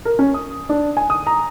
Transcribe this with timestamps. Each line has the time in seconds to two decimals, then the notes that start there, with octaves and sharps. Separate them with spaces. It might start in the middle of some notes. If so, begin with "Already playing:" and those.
0.05 A#4
0.19 C#4
0.34 D#6
0.69 D4
0.97 G#5
1.10 D#6
1.27 A#5